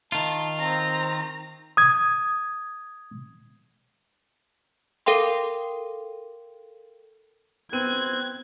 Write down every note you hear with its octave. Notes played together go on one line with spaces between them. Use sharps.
D#3 F4 A5
C4 A#5
D#6 G#6
A4 A#4 F5 G5 C6
B3 C4 F#6 G#6 D#7